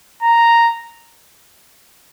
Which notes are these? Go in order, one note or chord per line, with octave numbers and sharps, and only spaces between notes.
A#5